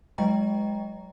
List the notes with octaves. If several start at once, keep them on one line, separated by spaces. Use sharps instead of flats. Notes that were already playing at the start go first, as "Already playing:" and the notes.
F#3 G#3 D#5 G5 A#5